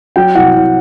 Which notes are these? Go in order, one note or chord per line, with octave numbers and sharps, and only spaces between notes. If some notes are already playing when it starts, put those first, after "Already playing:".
F#3 G5
C2 F#5
C2